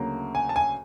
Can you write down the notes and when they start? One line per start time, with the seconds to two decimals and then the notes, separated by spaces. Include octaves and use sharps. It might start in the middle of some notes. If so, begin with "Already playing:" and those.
Already playing: D2 C#3 F#3 A#3
0.35 G#5
0.49 A5
0.56 G#5